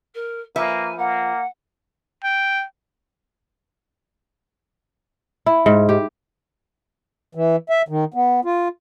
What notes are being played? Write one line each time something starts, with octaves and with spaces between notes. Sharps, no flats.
A#4
F3 A#3 B4 E5 G#5
A#3 F#5
G5
E4
G#2
G4
E3
E5
D#3
B3
F4